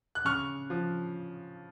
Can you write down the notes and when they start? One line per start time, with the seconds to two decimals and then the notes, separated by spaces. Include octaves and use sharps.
0.15 F#6
0.25 C#3 C#6 F6
0.70 F3